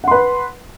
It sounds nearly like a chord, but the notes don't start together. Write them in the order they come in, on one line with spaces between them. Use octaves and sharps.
F#5 C6 B4